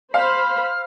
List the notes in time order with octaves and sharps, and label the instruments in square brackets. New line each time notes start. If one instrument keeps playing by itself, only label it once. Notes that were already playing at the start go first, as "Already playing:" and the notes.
[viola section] C5 B5 [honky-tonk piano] F5 [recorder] F6